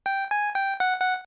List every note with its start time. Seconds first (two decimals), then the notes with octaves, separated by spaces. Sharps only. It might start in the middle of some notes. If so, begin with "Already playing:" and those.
0.06 G5
0.31 G#5
0.55 G5
0.80 F#5
1.00 F#5